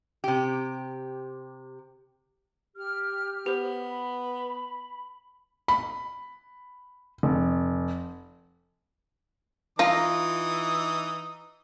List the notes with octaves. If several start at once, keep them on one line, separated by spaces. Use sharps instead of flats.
C3 G4
G4 F6
B3 G4 C5
B5
B5
F1
E3 D#4 F4 A#5 D#6